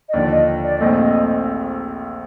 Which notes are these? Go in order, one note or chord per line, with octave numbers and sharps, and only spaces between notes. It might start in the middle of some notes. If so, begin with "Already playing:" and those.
D#5
D#2 D3 F3 D5
D#5
D5
A#1 A#2 A3 C4 D#5
D#5